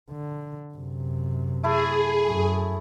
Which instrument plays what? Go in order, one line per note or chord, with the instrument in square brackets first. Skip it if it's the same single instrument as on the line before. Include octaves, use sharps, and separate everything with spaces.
[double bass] D3
F#2 C3
[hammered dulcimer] A3 E4 A4 [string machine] G#4
[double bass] F#2